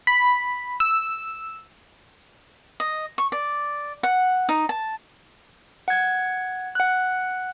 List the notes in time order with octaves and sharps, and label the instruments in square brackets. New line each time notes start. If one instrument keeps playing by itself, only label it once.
[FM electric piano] B5
E6
[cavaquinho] D#5
C#6
D5
F#5
D#4
A5
[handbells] F#5 G#6
F#5 F#6